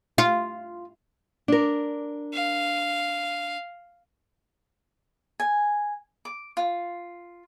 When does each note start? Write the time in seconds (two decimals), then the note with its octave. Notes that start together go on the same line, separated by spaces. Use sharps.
0.18 F4
1.48 D4 A#4
2.34 F5
5.40 G#5
6.25 D6
6.57 F4